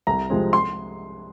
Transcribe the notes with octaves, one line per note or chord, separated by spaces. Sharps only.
C2 A#5
C3 F3 G#3 C4
C6